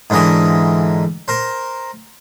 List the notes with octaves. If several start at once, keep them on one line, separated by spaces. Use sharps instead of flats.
G#2 D3 E3 A#4 D#5
A#4 C5